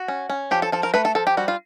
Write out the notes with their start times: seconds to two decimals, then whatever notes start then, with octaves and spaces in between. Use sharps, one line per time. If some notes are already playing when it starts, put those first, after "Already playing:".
Already playing: F#4
0.08 C#4
0.30 C#4
0.51 F3 G4
0.62 A4
0.72 F3 A4
0.83 A#4
0.94 A3 B4
1.05 A4
1.15 F3 A4
1.27 G4
1.37 G3 F#4
1.48 F4